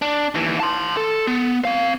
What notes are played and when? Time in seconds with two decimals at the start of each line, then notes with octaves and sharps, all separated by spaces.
0.02 D4
0.35 D#2 E3
0.60 A5 C6
0.97 A4
1.27 B3
1.65 C4 F5